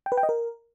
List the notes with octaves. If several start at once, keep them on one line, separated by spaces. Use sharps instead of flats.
G5
B4
G5
D#5
A#4